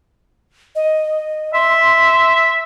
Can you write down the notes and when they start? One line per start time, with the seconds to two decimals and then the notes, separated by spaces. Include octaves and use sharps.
0.76 D#5
1.54 E5 C6